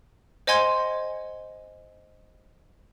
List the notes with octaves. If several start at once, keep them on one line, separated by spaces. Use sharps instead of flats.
C5 D#5 F#5 G#5 C6 G#6